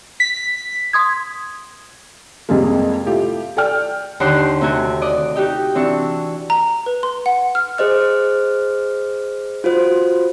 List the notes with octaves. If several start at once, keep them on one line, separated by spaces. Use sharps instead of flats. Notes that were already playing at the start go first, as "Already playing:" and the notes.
B6
C6 D#6 G#6
F2 C3 G3 G#3 A#3
A3 E4 F4 G4
A4 D5 G5 F6
D#2 D3 D#4 F#5 C6 D6
C6
C3 A3 C4 F#4 G#5
D5 D#5
D#4 F#4 G4 D#5
E3 C4 D4 C#6
A#5
B4
C6
F#5
F6
G#4 C5 D#5 F6
F4 F#4 C5